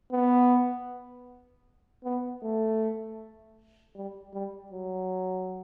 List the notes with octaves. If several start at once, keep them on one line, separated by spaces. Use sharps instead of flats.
B3
B3
A3
G3
G3
F#3